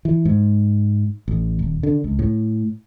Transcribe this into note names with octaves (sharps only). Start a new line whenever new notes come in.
E3
G#2
A1
D#1
D3
C#2
A2